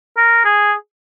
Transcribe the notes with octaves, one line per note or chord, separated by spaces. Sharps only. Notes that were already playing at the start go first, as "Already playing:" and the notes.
A#4
G#4